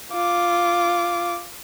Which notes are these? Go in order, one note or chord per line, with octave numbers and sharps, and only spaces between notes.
F4 D6